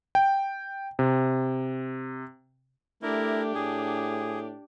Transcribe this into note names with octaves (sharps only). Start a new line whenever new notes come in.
G5
C3
A3 D4 E4 G4 A#4
A2 G#4